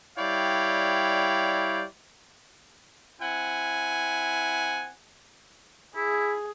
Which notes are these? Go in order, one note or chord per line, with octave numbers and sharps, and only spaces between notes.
G3 E4 C#5 D5 F5 G5
C4 E4 F#5 G#5
E4 G#4